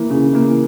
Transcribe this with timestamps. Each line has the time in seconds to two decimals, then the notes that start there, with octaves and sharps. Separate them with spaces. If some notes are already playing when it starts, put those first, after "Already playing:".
Already playing: E3 A#3
0.10 C#3
0.33 E3 A#3